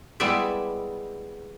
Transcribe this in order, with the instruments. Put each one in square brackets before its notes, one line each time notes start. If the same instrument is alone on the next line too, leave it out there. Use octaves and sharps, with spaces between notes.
[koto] G3 G#3 B3 E4 D5 E5